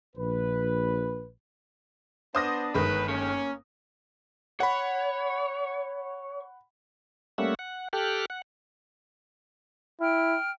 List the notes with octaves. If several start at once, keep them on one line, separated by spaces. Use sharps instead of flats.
A#1 B4
B3 D4 C5 D#6 A#6
G1 D#3 G#3 B4
A#3 C#4
C#5 F#5 B5
G3 A3 A#3 C#4 E5 F#5
F#5
G4 A4 G5 F6 F#6
F#5
E4 G5 F6